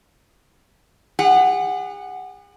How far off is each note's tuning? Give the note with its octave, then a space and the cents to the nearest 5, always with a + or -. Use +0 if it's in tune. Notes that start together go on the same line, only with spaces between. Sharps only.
G#4 -45 F#5 +0